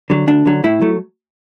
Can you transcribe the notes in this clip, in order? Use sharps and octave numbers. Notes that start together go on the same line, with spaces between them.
D3 F#3
D2 D4
D3 F#3
A2 E4
F#3 A3